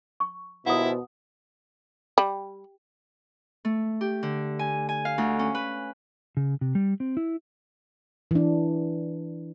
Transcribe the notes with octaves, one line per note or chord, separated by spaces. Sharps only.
C#6
D#2 B2 E3 F3 E4 F#5 A#5 D#6
G3
A3
G4
D3
G#5
G#5
F5
D2
C#4
B4
C#3
C3
G3
C4
E4
E3 D4